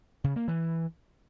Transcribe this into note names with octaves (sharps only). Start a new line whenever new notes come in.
C#3
A#3
E3